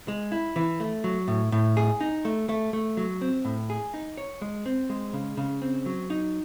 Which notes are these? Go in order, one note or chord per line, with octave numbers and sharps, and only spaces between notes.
G#3
E4
E3
A3
F#3
A2
A2
G#4
D#4
A3
A3
A3
F#3
C4
A2
G#4
D#4
C#5
G#3
C4
G#3
C#3
C#3
C4
F#3
D#4